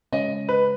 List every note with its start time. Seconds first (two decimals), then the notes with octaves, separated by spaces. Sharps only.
0.13 C#3 G#3 C#4 D#5
0.49 B4